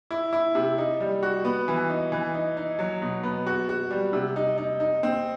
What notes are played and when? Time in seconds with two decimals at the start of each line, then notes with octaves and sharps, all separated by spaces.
0.11 E4
0.33 E4
0.55 C3
0.78 D#4
1.00 G3
1.23 F#4
1.45 B3
1.68 E3
1.90 D#4
2.12 E3
2.34 D#4
2.57 D#4
2.79 F#3
3.02 B2
3.23 B3
3.46 F#4
3.69 F#4
3.91 G3
4.13 C3
4.36 D#4
4.58 D#4
4.80 D#4
5.03 C4